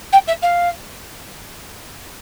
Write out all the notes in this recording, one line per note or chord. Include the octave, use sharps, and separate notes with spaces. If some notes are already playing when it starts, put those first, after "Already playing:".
G5
E5
F5